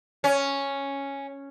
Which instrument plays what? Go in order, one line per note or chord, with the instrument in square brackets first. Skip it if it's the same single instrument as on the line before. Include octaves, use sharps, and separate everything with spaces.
[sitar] C#4